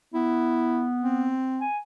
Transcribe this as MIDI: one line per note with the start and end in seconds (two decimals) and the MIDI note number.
0.14 1.34 59
0.14 0.87 64
1.02 1.65 60
1.61 1.78 80